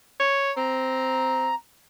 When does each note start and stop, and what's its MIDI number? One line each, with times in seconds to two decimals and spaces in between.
0.20 0.52 73
0.57 1.51 60
0.57 1.55 82